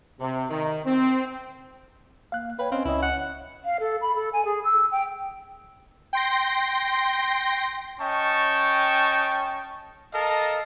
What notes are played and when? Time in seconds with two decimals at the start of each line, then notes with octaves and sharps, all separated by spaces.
0.19 C3
0.49 D#3
0.85 C4
2.32 A#3 F5 F#6
2.59 B4 C#5 F5 G5
2.72 C4 C#4 D#5 F5
2.85 C#2 E4 D#5
3.03 F#5
3.64 F5
3.80 A4
4.02 B5
4.16 A4
4.33 G#5
4.45 G#4
4.64 E6
4.92 G5
6.13 G5 C6 A#6
8.00 C#4 D#5 G5 A5 C#6
10.14 A4 A#4 D#5 F5 A5